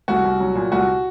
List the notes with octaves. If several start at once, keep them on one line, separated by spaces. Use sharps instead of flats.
C2 F#4
C2
F#3
A#2
C2 F#4